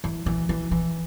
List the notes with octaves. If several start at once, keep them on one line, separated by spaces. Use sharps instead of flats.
E3
E3
E3
E3